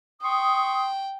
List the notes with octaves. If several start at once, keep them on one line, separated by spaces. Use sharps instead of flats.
G5 C6 C#6 D#6